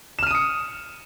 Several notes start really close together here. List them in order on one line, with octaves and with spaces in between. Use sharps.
E7 F6 D#7 D#6 C#7